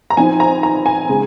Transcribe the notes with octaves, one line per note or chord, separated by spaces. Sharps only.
A#5
F3 C4 D#4 G#5
A#5
A#5
G#5
C#3 G#3